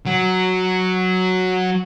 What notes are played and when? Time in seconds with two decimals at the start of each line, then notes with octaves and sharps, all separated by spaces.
0.06 F#3 F#4